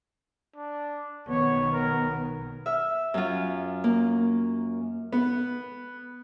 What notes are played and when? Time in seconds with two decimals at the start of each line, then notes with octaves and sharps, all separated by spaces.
0.56 D4
1.29 B1 D#3 B3 C#5
1.72 A#4
2.66 E5 F6
3.14 F#2 F4
3.84 A#3
5.12 B3